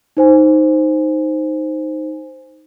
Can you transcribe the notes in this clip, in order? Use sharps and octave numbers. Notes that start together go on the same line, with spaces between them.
D#4 C5 G#5